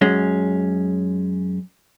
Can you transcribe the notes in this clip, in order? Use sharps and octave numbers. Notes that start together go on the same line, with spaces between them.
F#2 G#3 C#4